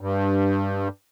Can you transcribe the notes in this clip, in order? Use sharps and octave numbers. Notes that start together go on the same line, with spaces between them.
G2